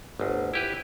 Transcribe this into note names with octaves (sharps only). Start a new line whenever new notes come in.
G1 D2
E4 G4 B4